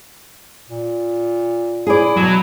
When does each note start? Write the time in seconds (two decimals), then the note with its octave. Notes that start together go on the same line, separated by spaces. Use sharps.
0.70 A#2
1.87 E4 G#4 D5
2.17 B2 F#3